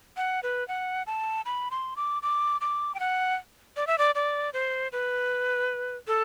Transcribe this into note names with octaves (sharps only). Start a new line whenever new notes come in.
F#5
B4
F#5
A5
B5
C6
D6
D6
D6
G5
F#5
D5
E5
D5
D5
C5
B4
A4